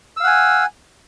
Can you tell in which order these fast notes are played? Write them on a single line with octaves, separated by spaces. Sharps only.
E6 F5 F#5 G#5